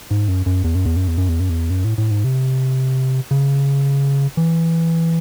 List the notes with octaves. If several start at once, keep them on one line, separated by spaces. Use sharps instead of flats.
G#2
F#2
F#2
E2
F#2
E2
F#2
E2
F#2
E2
F#2
E2
F#2
A2
A2
G#2
C3
C#3
E3